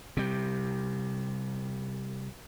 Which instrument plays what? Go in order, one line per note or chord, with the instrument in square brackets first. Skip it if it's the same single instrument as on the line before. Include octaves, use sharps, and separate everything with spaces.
[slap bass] C3 G3